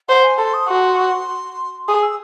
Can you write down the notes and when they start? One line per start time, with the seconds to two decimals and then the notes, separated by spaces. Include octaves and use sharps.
0.09 C5 F#5
0.24 G#5
0.38 A4 C6
0.54 D#6
0.68 F#4 C6
1.88 G#4 D#6
2.03 E6